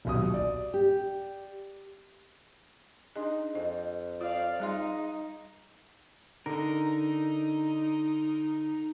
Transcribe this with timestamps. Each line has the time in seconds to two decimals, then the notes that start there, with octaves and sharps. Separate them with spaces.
0.05 D#1 B1 D#6
0.34 D5
0.74 G4
3.16 D4 D#4 G#4
3.55 F2 D#5
4.21 F4 D5 F5
4.60 G3 D#4 G#4 C6
6.46 D3 D#4 A#4